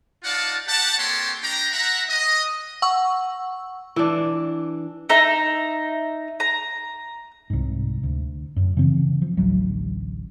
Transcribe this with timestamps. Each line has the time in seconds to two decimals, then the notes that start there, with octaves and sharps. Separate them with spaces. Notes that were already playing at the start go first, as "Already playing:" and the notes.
0.24 D#4 F4 D5 F5 F#5 A5
0.67 G4 F#5 A5
0.98 A#3 C4 G4 A4 C#5 C6
1.42 D4 G4 G5 A#5
1.72 E5 F#5 A#5
2.09 D#5
2.82 F#5 C#6 E6
3.96 E3 D4
5.09 D#4 E5 A#5
6.40 A#5
7.50 C2 G#2
8.03 D2
8.56 F#2
8.77 C#3 E3 C4
9.22 F3
9.37 A1 D2 F#3